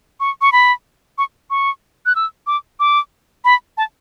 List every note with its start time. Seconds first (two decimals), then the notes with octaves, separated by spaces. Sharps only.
0.20 C#6
0.41 C#6
0.52 B5
1.18 C#6
1.50 C#6
2.06 F#6
2.16 E6
2.47 D6
2.80 D6
3.45 B5
3.77 A5